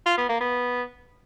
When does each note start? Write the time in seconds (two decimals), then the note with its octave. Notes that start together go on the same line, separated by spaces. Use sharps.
0.06 F4
0.18 B3
0.29 A#3
0.41 B3